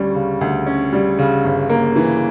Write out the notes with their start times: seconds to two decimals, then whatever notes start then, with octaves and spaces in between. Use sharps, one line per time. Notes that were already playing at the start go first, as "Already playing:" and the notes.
Already playing: D2 G3 C#4
0.15 C#3
0.41 D2
0.67 C#4
0.93 G3
1.19 C#3
1.44 G1
1.69 A#3
1.96 E3